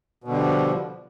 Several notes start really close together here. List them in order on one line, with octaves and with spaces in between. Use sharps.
B2 D3 G3 F3